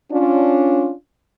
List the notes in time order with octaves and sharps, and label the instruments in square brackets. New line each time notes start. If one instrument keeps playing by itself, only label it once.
[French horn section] C#4 D4 F4